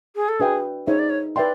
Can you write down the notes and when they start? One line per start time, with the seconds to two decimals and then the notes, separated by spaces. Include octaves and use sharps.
0.16 G#4
0.28 A4
0.40 D4 F#4 G#4 B4 E5 G5
0.87 D#4 G#4 C5 C#5 E5
0.99 D5
1.10 C#5
1.36 B4 D5 E5 G5 C6